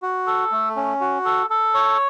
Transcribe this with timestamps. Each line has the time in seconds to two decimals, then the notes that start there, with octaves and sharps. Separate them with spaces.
0.02 F#4
0.27 A4
0.52 A3
0.76 C#4
1.01 F#4
1.25 A4
1.50 A4
1.74 C#5